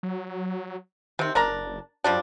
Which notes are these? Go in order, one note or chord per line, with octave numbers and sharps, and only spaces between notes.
F#3
C3 D#3 C4
F#1 D4 A#4 A#5
F#2 F3 G3 D4